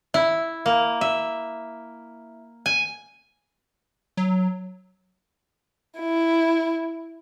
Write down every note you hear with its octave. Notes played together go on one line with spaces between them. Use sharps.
E4
A#3
E5
G#5
F#3
E4